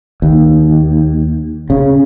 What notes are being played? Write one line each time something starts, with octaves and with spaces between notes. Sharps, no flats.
D#2
C#3